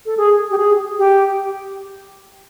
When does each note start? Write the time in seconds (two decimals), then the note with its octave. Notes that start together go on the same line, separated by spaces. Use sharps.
0.06 A4
0.17 G#4
0.51 G4
0.58 G#4
0.98 G4